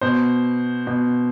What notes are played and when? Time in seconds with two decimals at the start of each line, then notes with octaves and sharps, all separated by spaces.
0.01 B2 C5
0.87 B2